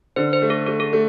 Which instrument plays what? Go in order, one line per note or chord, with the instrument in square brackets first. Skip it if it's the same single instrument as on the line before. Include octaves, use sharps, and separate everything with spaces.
[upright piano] D3 [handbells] C5
[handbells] C5
[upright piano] A3
[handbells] A4
[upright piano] A3 [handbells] A4
[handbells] A4
G#4
[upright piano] A3